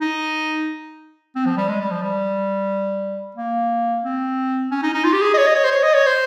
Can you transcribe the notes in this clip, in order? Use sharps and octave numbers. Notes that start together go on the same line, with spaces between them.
D#4
C4
F3
G3
G#3
G3
F3
G3
A#3
C4
C#4
D#4
D#4
F4
G4
G#4
D#5
C#5
D#5
C#5
C5
C#5
D#5
C#5
C5